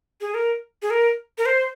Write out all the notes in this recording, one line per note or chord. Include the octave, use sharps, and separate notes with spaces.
G#4
A#4
G#4
A#4
A#4
C5